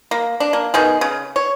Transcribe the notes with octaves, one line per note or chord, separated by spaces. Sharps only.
A#3
D4
A#3
B2 D#3 G#4
C#3
C#5